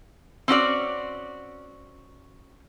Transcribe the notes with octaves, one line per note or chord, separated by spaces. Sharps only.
C4 C#4 F#4 D5